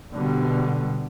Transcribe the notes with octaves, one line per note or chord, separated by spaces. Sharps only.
B2 D3 G3